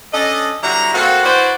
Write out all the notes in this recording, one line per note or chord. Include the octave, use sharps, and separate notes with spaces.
C#4 D4 A4 D#5
D3 F#3 G3 E4 F#4 A#5
A#3 C4 F4 F#4 A4
E4 F#4 B4 C5 D5 F#5